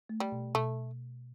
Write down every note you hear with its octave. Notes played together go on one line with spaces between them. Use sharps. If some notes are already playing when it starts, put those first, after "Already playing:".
A3
G3
B2
B2 A3